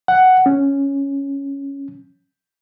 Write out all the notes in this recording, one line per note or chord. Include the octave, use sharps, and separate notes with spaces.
F#5
C#4